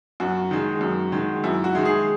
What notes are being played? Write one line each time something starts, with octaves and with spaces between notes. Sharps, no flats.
F#2 F#4
D#3 G#3
F#2
D#3 G#3
F#2 E4
F#4
D#3 G#3
G#4